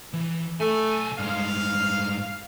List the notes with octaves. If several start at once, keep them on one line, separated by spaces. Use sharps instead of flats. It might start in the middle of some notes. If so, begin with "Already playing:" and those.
E3
B1 A3 G#5
G2 G#3 F5